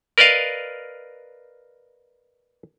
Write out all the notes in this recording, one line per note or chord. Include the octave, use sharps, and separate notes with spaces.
A#4 B4 D5 D#5 F5